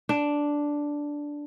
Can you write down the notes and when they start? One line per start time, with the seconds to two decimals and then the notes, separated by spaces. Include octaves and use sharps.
0.09 D4